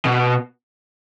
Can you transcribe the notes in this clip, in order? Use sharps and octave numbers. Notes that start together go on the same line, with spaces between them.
B2